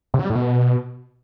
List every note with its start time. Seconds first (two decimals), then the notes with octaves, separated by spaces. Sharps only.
0.14 C3
0.19 F#3
0.25 G3
0.30 A2
0.35 B2